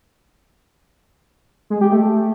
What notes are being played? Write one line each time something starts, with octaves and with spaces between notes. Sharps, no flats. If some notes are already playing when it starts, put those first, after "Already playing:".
G#3
G4
A3